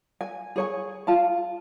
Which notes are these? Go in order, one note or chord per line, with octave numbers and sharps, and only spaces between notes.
G#5
G#4 C#5 G#5
F4 A5